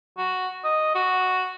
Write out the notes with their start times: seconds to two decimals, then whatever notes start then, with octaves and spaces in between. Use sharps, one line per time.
0.18 F#4
0.64 D#5
0.95 F#4